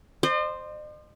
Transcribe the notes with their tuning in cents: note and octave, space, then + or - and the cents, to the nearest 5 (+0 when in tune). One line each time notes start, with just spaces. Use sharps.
C5 +0 D#5 -45